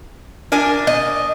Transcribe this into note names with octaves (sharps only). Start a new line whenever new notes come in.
D4 A#4 G#5
D#5